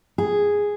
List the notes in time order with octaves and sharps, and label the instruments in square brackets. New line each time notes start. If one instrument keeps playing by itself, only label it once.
[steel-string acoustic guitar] G#4